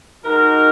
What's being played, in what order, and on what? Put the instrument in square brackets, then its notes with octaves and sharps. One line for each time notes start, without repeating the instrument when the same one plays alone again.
[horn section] G#3 D#4 F#4 A#4